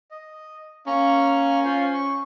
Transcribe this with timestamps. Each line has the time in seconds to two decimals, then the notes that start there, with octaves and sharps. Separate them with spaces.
0.11 D#5
0.87 A#3 C#4 A#5 C#6
1.65 F4 C5
1.94 C#6